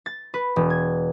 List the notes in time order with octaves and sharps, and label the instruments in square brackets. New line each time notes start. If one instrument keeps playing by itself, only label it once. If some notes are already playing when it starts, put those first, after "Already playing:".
[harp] A6
B4
E1
G#6